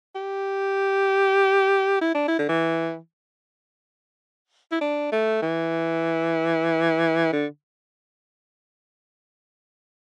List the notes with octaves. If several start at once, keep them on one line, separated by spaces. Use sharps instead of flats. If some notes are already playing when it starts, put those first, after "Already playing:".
G4
E4
D4
E4
D3
E3
E4
D4
A3
E3
D3